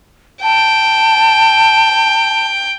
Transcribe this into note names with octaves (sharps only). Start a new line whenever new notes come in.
G5 A5